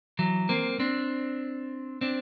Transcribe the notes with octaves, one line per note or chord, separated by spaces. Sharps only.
E3 F#3
A#3 C4
C4 D4
C4 D4